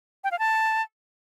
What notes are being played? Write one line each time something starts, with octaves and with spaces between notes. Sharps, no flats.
G5
F5
A5